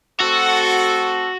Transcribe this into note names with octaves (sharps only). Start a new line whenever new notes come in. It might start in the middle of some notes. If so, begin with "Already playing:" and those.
A3 C4 F#4 A4